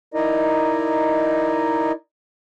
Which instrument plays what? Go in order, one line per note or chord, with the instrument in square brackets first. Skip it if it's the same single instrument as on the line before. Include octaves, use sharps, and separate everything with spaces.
[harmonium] D#4 E4 A#4 D5 D#5